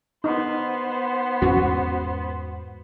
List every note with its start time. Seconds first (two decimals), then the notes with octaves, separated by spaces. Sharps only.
0.24 B3 D#4 C5
1.42 E2 G#2 C#4 F#4